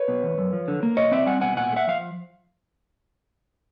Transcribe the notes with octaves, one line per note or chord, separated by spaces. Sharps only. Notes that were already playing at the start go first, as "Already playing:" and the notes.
Already playing: B4 C#5
B2
E2
F#2
F3
D3
A#3
B2 C#5 D#5
C4 D5 E5
G3 F#5 G#5
B2 F#5 G#5
A#2 F#5 G#5
A3
E5 F#5
F3 F5